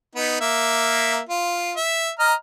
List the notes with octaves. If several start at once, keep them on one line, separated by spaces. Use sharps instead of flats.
B3 D#4
A#3 E5
F4
E5
D#5 A#5 F6